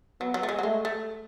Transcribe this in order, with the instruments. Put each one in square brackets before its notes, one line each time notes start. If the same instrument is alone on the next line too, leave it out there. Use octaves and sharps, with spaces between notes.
[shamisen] F#3 [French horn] B3
[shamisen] F#3
A3
G#3
F#3
[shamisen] G#3 [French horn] A3
[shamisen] A3